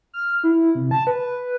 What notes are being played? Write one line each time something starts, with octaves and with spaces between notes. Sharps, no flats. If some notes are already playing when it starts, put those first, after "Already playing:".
F6
E4
C3
A5
B4